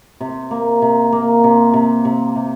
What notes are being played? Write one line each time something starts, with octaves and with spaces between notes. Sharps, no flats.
C3
A#3
C3
A#3
C3
C3
C3
C3